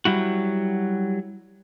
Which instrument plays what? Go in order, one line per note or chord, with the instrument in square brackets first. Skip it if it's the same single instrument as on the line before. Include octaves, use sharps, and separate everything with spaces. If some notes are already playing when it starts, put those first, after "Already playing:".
[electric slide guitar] F#3 G3 E4 F#4